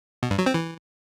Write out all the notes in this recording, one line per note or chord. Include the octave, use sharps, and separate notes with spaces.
B2
G2
F#3
C4
E3